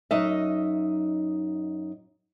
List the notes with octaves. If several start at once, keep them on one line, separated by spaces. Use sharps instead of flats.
F#2 D#4 D#5 E5